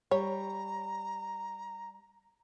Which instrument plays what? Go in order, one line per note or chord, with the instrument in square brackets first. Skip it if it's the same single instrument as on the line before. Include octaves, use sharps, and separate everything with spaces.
[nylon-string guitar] G3 [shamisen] C#5 [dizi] A#5